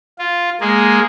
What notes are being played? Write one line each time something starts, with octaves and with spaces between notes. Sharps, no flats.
F4
G#3 A#3 G#4